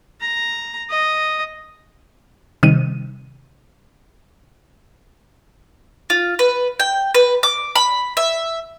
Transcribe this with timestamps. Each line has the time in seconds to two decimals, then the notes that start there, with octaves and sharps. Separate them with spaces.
0.21 A#5
0.90 D#5
2.63 C3 D#3 G3 D#7
6.10 F4
6.39 B4
6.80 G5
7.14 B4
7.43 D6
7.75 B5
8.17 E5